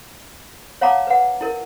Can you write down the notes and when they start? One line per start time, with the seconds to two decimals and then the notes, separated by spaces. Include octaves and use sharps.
0.81 C#5 F5 F#5 A5 A#5 D6
1.07 B4 F#5
1.41 E4 A#4